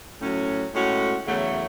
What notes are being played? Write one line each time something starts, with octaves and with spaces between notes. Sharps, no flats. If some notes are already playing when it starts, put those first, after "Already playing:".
A2 F#3 C#4
A2 G#3 C#4 F#4
E2 C#3 F#3 A3